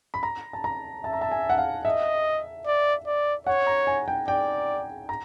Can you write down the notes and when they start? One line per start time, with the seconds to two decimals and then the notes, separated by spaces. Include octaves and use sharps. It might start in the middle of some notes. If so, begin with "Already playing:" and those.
0.14 B5
0.23 A#5
0.53 A5
0.64 A#5
1.04 E5 A5
1.13 A#5
1.21 A5
1.31 G#5
1.50 F#5
1.58 F5
1.85 D#5 E5
2.66 D5
3.06 D5
3.47 C#5 F#5
3.67 A#5
3.87 G#5
4.08 G5
4.28 D5 G5
5.09 A#5